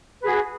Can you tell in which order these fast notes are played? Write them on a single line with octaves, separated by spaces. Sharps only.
B4 G#4 F#4